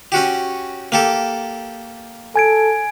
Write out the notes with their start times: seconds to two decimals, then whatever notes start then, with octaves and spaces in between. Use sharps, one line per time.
0.12 C#4 F#4 G4
0.92 A#3 G4 A4
2.36 A4 G#5 G#6 D7